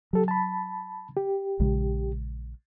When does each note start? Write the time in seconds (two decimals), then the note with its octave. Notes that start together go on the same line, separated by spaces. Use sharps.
0.13 F#3 G4 A4
0.28 A5 B5
1.16 G4
1.60 A#1 C#3 G#3